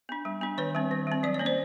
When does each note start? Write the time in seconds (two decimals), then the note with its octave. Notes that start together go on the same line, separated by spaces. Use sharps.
0.09 B3 D4
0.25 G3
0.41 B3 D4
0.58 D#3 B4 C#5
0.75 G3 C4
0.91 D#3
1.07 G3 C4
1.23 F#3 D5
1.34 C#5
1.39 A#3 C#4
1.46 C5 D5